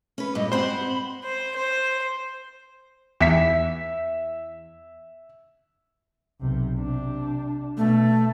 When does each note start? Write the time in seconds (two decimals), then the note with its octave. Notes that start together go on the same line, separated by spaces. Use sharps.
0.18 C#4 B4
0.35 G2 A#2 D#5
0.52 G#2 C4 C5 F#5 B5
1.23 C5
1.56 C5
3.20 E2 E5 B6
6.40 B1 C3
6.77 C3 D4
7.77 B2 A3